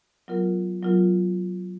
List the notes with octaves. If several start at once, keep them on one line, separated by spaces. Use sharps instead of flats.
F#3 B3 F4 A#4
F#3 B3 F4 A#4